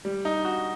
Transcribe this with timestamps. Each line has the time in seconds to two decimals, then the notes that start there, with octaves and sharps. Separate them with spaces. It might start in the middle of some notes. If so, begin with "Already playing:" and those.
0.05 G3
0.25 D#4
0.45 F#4